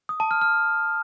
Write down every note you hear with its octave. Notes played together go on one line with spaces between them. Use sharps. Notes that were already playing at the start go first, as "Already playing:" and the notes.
D#6
A5
F6
F6